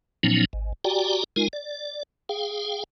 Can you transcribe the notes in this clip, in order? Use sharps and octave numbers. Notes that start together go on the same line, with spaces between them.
A#2 F3 F#3 B3 C#4 D#4
G#1
F#4 G4 D5 G5 G#5 A#5
G#3 D#4 F4 A#4 G#5
D5
G#4 F5 G5